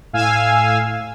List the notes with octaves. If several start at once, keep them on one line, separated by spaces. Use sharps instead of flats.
A2 F5 G#5 E6